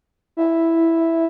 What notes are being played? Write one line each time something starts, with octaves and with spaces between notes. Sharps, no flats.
E4